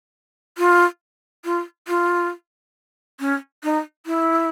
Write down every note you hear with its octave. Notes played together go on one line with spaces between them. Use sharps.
F4
F4
F4
C#4
D#4
E4